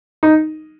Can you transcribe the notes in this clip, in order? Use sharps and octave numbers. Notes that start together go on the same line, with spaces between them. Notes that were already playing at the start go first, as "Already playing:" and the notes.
D#4